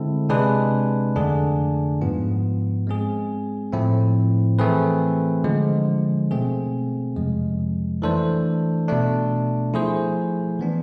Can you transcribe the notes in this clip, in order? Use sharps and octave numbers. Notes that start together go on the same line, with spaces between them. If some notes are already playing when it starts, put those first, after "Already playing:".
Already playing: D3 G#3 C4 E4 A4
C3 G#3 D4 G#4 B4
F2 D3 A3 D4 G#4
G#2 F3 B3 F4
G#3 C4 G#4
A2 F3 A3 C4 E4
E3 A3 C4 G#4 B4
D3 F3 G#3
B2 A3 C4 G#4
F2 C3 F3 G#3
E3 A3 D4 A4 C5
B2 A3 D4
F3 A3 E4 G#4 C5
E3 B3 D4